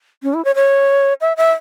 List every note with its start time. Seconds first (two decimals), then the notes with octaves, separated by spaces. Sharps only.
0.23 C#4
0.34 E4
0.45 C#5
0.55 C#5
1.21 E5
1.37 E5